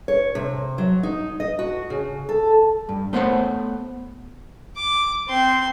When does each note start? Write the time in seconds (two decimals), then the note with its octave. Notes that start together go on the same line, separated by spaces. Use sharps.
0.08 C#5
0.35 C3
0.78 F#3
1.03 D#4
1.40 D#5
1.59 F#4
1.90 C#3
2.29 A4
2.89 G2
3.13 A3 B3 C5 C#5 F5 F#5
4.76 D6
5.28 C4 C6